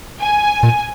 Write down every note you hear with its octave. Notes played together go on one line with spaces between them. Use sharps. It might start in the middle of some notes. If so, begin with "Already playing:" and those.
G#5
A#2